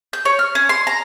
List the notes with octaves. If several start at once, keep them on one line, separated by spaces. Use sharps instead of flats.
G6
C#5
F6
C#4
C6
A#5